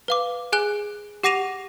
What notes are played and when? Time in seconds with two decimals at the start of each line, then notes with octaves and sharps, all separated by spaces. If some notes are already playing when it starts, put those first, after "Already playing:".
0.08 B4 F5 D6
0.53 G#4 G#5 F#6 G7
1.23 G4 F#5 D6 A#6 D#7 F7